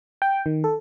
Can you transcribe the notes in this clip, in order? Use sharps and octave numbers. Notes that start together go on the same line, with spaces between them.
G5
D#3
A4